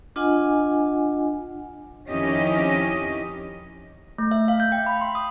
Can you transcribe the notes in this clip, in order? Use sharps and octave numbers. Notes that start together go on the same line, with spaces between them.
D4 F4 D#5 F#5 G#5
F2 D#3 C#4 E4 G4 D#5
A3
E5
F5
G6
G5
B5
C6
D#6